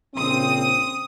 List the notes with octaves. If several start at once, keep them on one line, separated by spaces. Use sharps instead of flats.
A#1 C#3 C4 D#6